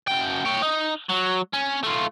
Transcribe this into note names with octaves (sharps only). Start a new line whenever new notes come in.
F#2 G5
C#5 G5
D#4
F#3
C#4
A3 F4